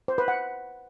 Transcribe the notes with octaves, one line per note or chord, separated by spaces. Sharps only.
C5
B4
F#5